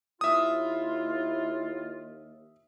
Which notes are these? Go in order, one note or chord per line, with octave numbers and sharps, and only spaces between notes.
D#2 E4 F4 E5 D#6